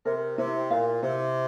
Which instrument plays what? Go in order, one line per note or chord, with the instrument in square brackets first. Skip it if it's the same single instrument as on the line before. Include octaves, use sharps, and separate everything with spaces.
[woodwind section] C3 [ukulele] A#4
[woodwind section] C3 [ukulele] E4
[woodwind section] A#2 [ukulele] F5
[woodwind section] C3 [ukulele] E4